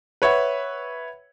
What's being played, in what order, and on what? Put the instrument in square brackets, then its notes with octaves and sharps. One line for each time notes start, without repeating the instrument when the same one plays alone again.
[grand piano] B4 C#5 E5 F#5